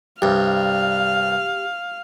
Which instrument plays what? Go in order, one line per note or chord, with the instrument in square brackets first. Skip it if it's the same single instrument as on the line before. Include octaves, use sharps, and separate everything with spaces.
[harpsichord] C2 G2 [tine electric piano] G4 [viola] F5